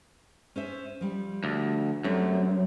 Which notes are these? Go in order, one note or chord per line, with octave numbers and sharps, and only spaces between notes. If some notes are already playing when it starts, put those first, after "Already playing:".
C#4 C5 E5
F3 G3
D2
F#2 G3 A3 C4